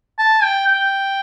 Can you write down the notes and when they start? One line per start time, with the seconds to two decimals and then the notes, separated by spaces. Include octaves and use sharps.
0.19 A5
0.43 G5
0.67 G5